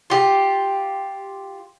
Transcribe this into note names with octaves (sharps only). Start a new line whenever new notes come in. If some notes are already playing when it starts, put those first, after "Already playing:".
F4 G4